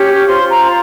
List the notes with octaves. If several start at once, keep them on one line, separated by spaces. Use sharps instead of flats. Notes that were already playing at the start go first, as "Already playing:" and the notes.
Already playing: C#4 G4 C#5
F4 C5 C6
A#5